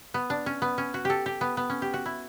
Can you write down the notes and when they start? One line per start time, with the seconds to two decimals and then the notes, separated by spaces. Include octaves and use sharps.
0.14 B3
0.30 D4
0.46 C#4
0.62 B3
0.78 C#4
0.94 F#4
1.05 G4 A4
1.26 G4
1.41 B3
1.57 B3
1.70 C#4
1.82 G4
1.94 F#4
2.06 E4